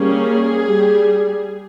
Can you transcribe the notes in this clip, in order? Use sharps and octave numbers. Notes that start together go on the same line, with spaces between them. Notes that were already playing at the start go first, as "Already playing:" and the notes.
Already playing: G3 A#3 C#4 G#4
G3